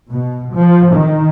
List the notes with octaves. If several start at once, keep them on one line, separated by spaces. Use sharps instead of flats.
B2
F3
D#3